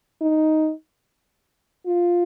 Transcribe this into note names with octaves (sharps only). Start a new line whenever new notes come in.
D#4
F4